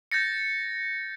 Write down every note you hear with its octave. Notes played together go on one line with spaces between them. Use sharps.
G6 A6 A#6 C#7